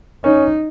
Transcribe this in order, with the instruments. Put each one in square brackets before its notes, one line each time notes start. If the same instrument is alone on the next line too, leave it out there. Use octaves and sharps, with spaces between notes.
[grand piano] C#4 [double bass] D#4